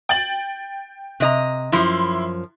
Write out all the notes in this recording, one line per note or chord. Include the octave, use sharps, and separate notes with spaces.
G5 A6 F#7
C3 D#5 A#5
F#2 F3 E4 C6